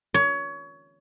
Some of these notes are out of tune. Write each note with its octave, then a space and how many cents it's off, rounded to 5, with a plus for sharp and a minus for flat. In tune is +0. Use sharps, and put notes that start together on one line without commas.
C#5 +25